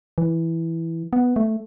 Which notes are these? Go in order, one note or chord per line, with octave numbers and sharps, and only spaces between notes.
E3
B3
A3